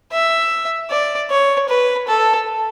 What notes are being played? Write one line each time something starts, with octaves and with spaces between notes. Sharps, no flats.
E5
D5
C#5
B4
A4